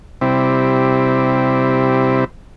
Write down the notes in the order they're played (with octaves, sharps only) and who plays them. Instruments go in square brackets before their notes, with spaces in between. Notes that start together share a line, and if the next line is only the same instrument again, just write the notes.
[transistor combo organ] C3 G3 C4 E4